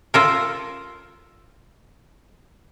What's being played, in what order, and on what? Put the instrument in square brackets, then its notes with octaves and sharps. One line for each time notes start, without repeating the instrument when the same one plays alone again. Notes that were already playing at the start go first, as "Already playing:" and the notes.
[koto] F4 A4 A#4